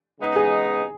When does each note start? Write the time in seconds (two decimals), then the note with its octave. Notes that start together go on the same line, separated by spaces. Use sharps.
0.20 C#3 G#3 B3 D#4
0.36 G#4